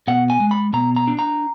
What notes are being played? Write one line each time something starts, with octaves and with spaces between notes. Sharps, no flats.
B2 F#5
G#5
G#3
B5
B2 A#5
A#5
D4
A#5